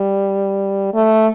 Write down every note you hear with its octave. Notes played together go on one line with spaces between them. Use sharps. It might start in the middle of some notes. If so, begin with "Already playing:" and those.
Already playing: G3
A3